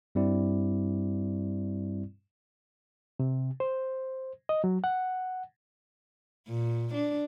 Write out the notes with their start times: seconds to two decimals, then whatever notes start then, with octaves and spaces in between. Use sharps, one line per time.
0.15 G2 G3 C4 E4 D5
3.20 C3
3.60 C5
4.49 D#5
4.64 F#3
4.84 F#5
6.48 A#2
6.93 D4